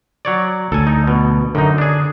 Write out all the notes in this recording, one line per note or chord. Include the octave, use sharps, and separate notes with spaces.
F#3 C#5 D5
D2 A4 G#5
D#4
B2
F#2 D3 D#4
D4 G#4